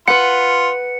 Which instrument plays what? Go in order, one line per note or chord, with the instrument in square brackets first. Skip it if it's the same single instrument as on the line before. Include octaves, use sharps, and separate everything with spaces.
[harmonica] F4 [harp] B4 F#5 [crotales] C#7